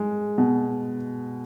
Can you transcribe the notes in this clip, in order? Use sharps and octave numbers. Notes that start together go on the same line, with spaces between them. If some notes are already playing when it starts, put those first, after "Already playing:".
Already playing: G#3
B2